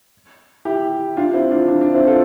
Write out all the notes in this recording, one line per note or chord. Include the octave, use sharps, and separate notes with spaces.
E4 G4
D4 F4
C4 E4
D4 F4
D4
D4
C4 E4
F4 A4